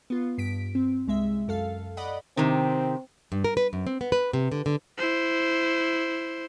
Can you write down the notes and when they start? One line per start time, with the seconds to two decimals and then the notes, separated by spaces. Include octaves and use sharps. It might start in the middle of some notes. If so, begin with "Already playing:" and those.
0.10 B3 F4
0.38 G2 B6 D7
0.75 C4
1.07 C2 G#3 E5
1.48 F#2 A4 F5
1.97 D5 D#5 F#5 B5
2.37 C3 D#3 C4
3.32 G2
3.44 A#4
3.57 B4
3.73 F#2
3.87 C4
4.01 B3
4.12 B4
4.33 C3
4.52 D3
4.66 D3
4.98 E4 C5